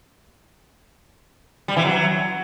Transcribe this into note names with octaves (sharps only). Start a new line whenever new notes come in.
G3
E3
F#3